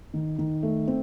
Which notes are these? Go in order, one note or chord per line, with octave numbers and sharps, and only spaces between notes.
D#3
D#3
A3
C4